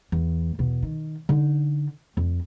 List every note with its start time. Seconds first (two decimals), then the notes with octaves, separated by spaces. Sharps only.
0.12 E2
0.59 E2 B2
0.82 D#3
1.29 D3 D#4
2.17 F2